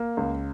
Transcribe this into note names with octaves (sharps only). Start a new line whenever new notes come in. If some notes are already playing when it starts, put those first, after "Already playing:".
Already playing: A#3
C#2